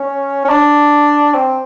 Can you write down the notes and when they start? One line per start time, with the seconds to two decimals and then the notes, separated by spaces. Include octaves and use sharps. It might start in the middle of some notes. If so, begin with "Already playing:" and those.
Already playing: C#4
0.45 C#4
0.49 D4
1.35 C4